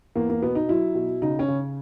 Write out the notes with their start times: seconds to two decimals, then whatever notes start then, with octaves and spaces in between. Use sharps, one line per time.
0.16 E2 A#3
0.29 A#3
0.42 B2 B3
0.55 D#4
0.69 F#3 E4
0.95 B2
1.22 C#3 D#4
1.39 C#4
1.48 C#3